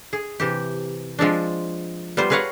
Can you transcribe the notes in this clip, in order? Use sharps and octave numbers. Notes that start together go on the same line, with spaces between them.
G#4
C3 E3 G4
F3 G#3 C4 D4
G3 B3 F4 C5
G#4 A#4 B4 C#5 F5 F#5